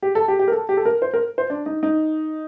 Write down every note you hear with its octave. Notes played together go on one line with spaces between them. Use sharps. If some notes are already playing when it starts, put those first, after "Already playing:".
G4
A4
G4
G4
A#4
A4
G4
A4
A#4
C5
A#4
C5
D4
D#4
D#4